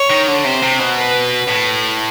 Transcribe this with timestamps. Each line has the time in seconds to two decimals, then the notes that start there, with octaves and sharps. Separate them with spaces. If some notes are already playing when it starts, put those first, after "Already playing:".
Already playing: C#5
0.10 D#3
0.28 D3
0.45 C3 C5
0.62 C3
0.80 B2
0.97 B4
1.48 A2